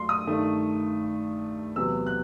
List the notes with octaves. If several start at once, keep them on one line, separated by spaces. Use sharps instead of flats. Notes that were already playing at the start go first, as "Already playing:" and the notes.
Already playing: G2 F#3 A3 C6
D#6
G2 D#3 A3
E2 C3 F#3 B3 E6
F#6